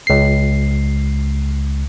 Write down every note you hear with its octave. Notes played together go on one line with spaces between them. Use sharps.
C#2 C7